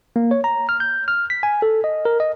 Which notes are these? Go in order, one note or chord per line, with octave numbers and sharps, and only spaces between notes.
A#3
C#5
A#5
F6
G6
F6
B6
G#5
A4
D#5
A#4
D#5